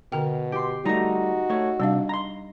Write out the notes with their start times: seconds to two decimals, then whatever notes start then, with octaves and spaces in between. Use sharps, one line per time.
0.12 B2 D3 A#4 G5
0.52 G4 C6
0.85 G3 A3 D#4 F#4 A#5
1.50 A3 C#5
1.80 C3 G3 D4 F5
2.09 A#5 C6